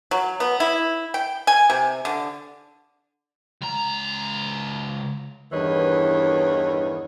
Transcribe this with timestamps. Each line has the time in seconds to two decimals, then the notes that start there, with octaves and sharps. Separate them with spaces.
0.11 F#3
0.40 B3
0.60 E4
1.14 G5
1.47 G#5
1.70 C3
2.05 D3
3.62 C#2 A#5
5.52 E2 G2 D#3 E3 C#5 D#5